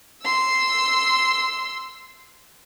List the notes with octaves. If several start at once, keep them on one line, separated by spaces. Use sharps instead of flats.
C6 E6